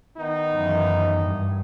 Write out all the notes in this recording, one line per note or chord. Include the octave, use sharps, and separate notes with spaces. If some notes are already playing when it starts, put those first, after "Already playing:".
D#3 B3 D#4
F#2 E3
G2